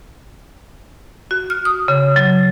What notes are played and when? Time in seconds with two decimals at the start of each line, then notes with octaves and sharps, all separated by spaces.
1.31 F#4
1.50 F6
1.65 D#6
1.88 C#3
2.16 F#3